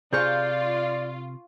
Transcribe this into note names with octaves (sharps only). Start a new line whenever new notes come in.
C3 F4 G#4 D5 A#5 C#6 F6 G6